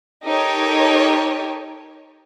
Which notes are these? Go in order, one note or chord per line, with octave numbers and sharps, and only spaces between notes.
D#4 G4 A4 A#4 C#5